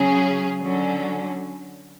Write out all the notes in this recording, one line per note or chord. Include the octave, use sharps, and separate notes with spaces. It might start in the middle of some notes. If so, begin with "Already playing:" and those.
Already playing: C#3 F#3 C#4 G#4
D3 F#3 C#4